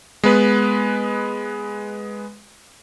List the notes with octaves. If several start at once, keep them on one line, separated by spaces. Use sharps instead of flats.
G#3 B3 B4